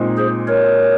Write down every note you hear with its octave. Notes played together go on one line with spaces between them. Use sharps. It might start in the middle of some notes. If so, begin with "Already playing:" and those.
Already playing: A#2 G#3 C4 D#4
G#4 C5
A#4 C#5